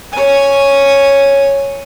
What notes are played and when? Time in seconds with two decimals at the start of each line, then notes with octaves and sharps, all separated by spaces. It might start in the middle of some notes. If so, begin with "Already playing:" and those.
0.12 C#5 G#5